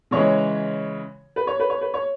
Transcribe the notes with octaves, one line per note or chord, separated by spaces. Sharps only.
C#3 E3 G#3 C#5
B4
C#5
B4
C#5
B4
C#5